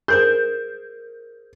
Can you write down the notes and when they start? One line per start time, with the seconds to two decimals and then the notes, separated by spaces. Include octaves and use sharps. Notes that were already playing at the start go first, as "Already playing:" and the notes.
0.08 G#4 A#4 C5 G6